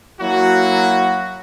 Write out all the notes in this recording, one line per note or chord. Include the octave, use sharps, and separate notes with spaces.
F#3 A#3 E4 F#4